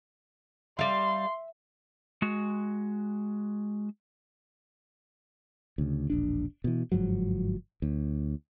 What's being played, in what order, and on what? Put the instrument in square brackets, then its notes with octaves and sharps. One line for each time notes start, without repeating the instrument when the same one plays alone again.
[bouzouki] G3 F5 [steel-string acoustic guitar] E5 [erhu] C6
[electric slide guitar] G#3 F#4
[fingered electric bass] D2 C#3
E1 A#1 D4
B2 E3
G1 G#2 F3 F#3
D2